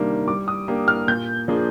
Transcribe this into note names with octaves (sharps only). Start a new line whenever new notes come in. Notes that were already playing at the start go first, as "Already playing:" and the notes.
Already playing: C3 D#3 G3 A#3 D4
G3 D6
D#6
A#3 D4 G4
F6
A#2 G6
F3 A#3 D4 G#4